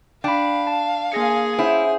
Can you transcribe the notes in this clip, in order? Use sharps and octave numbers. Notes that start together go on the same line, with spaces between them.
D4 F5 G5 B5
A5
A#3 G#4 G#5 A#6 C#7
C#4 E4 C5 F#5